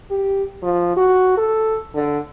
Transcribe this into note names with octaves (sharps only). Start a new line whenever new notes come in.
G4
F3
F#4
A4
D3